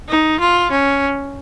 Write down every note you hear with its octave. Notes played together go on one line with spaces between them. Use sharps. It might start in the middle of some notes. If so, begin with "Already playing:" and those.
D#4
F4
C#4